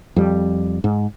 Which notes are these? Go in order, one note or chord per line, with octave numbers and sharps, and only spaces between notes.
F2 G3
G#2